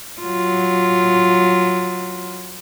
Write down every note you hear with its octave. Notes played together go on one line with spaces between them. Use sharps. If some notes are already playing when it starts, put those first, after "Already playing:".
F#3 F4